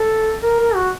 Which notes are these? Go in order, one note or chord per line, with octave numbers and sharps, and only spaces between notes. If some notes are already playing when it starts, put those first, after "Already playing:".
Already playing: A4
A#4
A#4
F#4